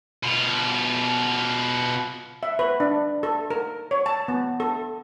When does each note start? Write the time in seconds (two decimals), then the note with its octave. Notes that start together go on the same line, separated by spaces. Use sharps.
0.23 B2 F4
2.43 E5
2.59 B4
2.80 D4
3.23 A4
3.50 A#4
3.91 C#5
4.06 A5
4.28 B3
4.60 A4